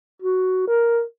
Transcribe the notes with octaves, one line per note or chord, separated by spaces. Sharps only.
F#4
A#4